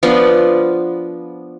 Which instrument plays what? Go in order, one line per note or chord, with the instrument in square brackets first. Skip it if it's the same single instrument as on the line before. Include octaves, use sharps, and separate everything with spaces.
[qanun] F3 B3 D4 F4